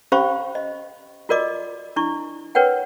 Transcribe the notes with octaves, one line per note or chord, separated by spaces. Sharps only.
C#4 G4 C5 F5 B5 C#6
D#5
F4 F#4 A#4 D5 D#5 D6
D4 E4 C#6
A#4 B4 C#5 F#5 G5